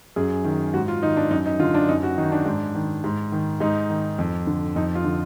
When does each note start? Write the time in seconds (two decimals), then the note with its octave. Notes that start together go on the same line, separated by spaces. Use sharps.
0.16 F#2 G#4
0.44 D#3
0.74 G#2 F#4
0.88 F4
1.02 D#3 D#4
1.17 D4
1.30 F#2 D#4
1.46 D#4
1.60 D3 F4
1.74 D4
1.88 F#2 D#4
2.03 F#4
2.17 D#3 D#4
2.32 D4
2.46 G#2
2.75 D#3
3.04 G#2
3.32 D#3
3.60 G#2 D#4
3.90 D#3
4.19 F2
4.47 D3
4.76 F2 D#4
4.95 F4
5.04 D3